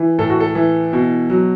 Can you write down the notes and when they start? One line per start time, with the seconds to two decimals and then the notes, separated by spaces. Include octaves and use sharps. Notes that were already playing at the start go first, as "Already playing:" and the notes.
Already playing: E3
0.19 A2 A4
0.30 F#4
0.40 A4
0.55 E3
0.93 B2
1.30 F#3